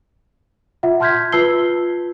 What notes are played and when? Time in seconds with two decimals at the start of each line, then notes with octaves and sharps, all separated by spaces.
0.83 F4 E5 F#5
1.00 A5 C6 F6 G6 G#6 B6
1.32 F4 B4 A5 E6 C7 G7